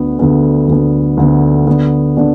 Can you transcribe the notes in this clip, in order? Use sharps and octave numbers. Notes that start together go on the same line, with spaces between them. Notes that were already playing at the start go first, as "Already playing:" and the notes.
Already playing: D2 D3 B3
D2 D3 B3
D2 D3 B3
D2 D3 B3
D3 B3 D4
D3 B3 D4